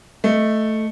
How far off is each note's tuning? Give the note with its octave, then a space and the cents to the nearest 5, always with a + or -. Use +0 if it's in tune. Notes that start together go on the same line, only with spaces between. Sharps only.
A3 +0 D#5 +0